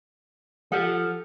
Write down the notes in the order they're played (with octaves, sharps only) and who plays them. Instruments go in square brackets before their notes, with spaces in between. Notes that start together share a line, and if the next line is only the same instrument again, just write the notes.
[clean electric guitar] F3 [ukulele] G4 A4 F#5